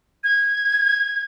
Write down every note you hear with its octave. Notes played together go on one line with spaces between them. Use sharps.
G#6